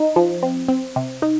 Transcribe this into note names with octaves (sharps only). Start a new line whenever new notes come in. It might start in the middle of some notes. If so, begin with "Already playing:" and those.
Already playing: D#4
F3
C4
C4
C3
D#4